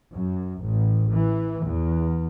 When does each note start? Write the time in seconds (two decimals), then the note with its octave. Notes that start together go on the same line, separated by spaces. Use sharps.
0.13 F#2
0.63 A1
1.13 E3
1.66 E2